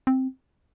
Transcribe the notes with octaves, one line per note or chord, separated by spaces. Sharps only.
C4